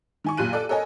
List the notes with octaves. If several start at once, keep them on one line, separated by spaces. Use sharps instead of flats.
D#3 G#5 C#6
F#1 A#2 G4 F#6 D#7
A4 D5
A4 A#4 C#5 D#5 G#5